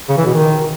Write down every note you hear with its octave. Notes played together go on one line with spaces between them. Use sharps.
C#3
E3
B2
D#3